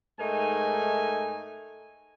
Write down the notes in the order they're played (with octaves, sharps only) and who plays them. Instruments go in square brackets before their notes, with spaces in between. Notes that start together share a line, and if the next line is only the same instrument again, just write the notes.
[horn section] G#2 A3 D#4 A#4 G#5